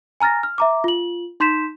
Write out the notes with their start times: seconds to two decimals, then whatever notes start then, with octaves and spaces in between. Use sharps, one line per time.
0.20 G#5 A#5 F6 A6 A#6
0.43 F6
0.58 E5 A#5 D6
0.84 F4 F#7
1.40 D#4 C6 G6 B6 E7